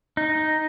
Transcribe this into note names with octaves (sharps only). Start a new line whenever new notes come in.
D#4